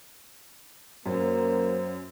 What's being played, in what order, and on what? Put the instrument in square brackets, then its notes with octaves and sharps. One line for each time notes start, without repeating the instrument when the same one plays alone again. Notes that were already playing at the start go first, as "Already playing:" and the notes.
[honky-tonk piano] F#2 [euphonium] A#3 [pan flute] C5